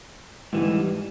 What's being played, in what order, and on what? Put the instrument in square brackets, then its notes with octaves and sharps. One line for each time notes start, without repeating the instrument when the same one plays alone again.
[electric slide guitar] G#2 E3 G3